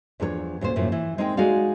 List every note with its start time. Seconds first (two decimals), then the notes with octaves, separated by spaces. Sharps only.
0.20 E2 F3 D4 A4 C#5
0.61 D2 A#2 C#4 C5
0.76 F#2 A2 C3 F3 A#3
0.92 E3
1.18 G#3 C4 D#4 A#4 G5
1.37 G#3 D#4 F#4 D5 F5